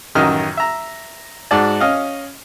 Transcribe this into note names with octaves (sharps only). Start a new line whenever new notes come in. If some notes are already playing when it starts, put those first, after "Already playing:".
A1 F#2 D#3 D#5 F6
E5 A#5
G#2 F#4 D5 A5
C#4 D#5 F5